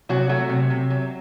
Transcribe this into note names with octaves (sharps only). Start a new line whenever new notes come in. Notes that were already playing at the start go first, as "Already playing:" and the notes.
C3 F#3 F#4
F#3 A3 F#4
C3
C3
F#3